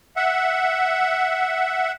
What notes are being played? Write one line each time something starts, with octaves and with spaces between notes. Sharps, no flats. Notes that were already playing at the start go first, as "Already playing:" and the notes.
E5 F#5